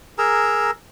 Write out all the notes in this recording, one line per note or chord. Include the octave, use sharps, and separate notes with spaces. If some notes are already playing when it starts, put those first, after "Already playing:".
G#4 A#4 A#5 E6